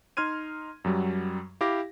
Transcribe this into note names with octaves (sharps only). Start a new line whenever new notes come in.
D#4 C6 F6 G#6 D#7
F#2 F#3 G3
E4 G4 F5 D6 A#6